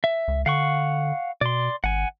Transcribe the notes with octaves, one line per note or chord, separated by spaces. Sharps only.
E5
C#2
D3 F5 F#5 C#6
B2 D5 C6
G#1 F#5 G#5